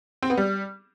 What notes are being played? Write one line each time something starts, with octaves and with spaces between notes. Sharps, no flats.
C4
B3
G3